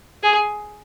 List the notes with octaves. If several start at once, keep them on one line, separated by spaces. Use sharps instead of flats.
G#4